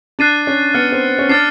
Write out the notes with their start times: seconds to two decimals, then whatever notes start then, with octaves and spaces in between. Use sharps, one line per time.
0.19 D4 F#6 A6 C7 D#7
0.47 C#4
0.74 B3 F6 A6 C#7
0.92 C4
1.19 C#4
1.29 D4 F6 A6 C7